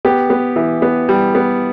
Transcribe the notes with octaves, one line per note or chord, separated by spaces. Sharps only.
B3 G4
B3
E3
B3
G3
B3